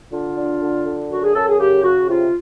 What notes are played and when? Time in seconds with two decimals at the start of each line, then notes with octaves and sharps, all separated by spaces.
0.12 D3 F4
0.37 D4
0.61 D3
0.86 D3
1.10 F#2 F#4
1.23 G#4
1.35 F#2 A4
1.48 G#4
1.60 C#3 G4
1.84 C#3 F#4
2.08 C3 F4